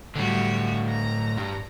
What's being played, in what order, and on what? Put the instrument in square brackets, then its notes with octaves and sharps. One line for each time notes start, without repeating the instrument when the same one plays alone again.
[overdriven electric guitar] A2 D3 [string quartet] G3 F#4 G4
[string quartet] A#5 A#6
[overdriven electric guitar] G2